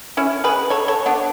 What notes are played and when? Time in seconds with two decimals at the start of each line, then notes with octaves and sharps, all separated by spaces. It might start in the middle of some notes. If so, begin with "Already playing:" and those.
0.17 C#4 E4
0.44 G#4 B4
0.70 A4 C#5
0.88 A4 C#5
1.06 B3 D4